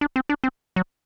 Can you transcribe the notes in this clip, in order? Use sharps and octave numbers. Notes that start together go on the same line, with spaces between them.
D4
C4
D4
C4
F#3